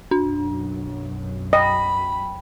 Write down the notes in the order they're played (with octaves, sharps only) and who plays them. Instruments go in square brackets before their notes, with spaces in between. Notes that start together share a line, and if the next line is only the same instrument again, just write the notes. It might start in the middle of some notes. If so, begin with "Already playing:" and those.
[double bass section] B1 F#2 F#3 [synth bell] D4
[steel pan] D#5 [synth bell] G5 [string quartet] B5